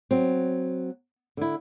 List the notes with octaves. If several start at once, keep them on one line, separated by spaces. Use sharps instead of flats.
F#3 C4
D3 E4